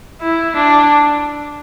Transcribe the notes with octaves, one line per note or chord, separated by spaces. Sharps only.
E4
D4